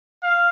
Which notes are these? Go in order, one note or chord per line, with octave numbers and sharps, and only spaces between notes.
F5